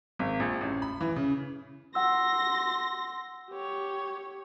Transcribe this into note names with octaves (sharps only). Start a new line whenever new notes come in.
G#1
A#1
A1
B5
E3
C#3
F#5 C6 E6 A#6
G4 C#5